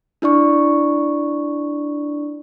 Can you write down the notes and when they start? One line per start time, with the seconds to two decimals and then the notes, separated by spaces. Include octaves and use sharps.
0.22 D4 E4 D5 C#6